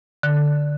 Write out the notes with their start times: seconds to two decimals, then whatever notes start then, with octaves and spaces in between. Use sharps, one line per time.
0.23 D3